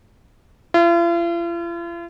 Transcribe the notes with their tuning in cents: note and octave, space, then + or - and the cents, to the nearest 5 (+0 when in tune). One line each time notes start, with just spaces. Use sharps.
F4 -45